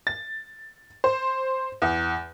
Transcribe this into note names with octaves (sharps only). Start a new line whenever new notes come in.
A6
C5
E2